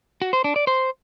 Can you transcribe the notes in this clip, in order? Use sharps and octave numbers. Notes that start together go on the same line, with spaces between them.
F#4
C5
D4
D5
C5